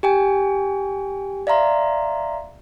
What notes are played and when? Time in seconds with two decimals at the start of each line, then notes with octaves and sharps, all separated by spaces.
0.03 G4 G5 G#5
1.47 D5 E5 F5 A#5 C6